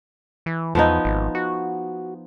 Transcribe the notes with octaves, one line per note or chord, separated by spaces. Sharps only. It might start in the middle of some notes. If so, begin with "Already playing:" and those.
E3
E2 F3 B3 D#4
G#1
F#4